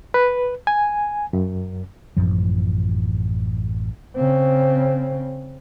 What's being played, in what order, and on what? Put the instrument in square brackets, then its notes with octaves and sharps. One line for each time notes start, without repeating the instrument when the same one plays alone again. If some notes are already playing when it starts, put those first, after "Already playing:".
[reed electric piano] B4
G#5
F#2
[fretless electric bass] A1 F#2 F3
[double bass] C#3 C4